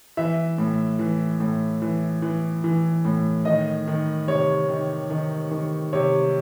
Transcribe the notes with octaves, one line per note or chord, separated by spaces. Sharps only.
E3 E5
A2
E3
A2
E3
E3
E3
A2
D#3 D#5
D#3
C3 C#5
D#3
D#3
D#3
C3 C#5